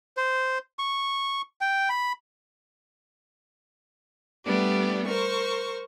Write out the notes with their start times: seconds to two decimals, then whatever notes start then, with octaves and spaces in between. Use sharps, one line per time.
0.17 C5
0.79 C#6
1.61 G5
1.89 B5
4.45 G3 A3 B3 D4 G4
5.06 A#4 C5 C#6